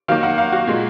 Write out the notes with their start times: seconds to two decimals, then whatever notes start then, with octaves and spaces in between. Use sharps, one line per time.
0.08 D#3 F#3 A#3 F5
0.23 F#5
0.38 F5
0.52 F#4
0.67 A#2 G#3